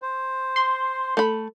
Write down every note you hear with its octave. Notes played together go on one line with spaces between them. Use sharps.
C5
C6
A3 B5